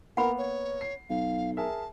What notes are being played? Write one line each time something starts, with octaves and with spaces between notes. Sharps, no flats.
A#3 B3 A#4 F#5 B5
C#5
C7
B1 F5
G#4 A#4 E5 A5